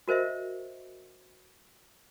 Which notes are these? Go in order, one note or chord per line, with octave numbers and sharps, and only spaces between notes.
F#4 A#4 C5 D#5 E5